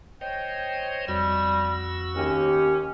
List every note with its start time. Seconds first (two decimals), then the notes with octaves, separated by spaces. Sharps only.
0.21 C5 C#5 D#5 G5
1.08 F2 G3 F#4 E6
2.16 D#2 C#4 G4